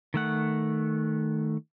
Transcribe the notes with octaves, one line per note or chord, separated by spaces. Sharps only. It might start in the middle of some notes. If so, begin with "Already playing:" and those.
D#3 A3 F#5